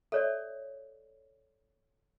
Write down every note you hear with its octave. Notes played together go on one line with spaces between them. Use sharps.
A4 C#5 D5 E5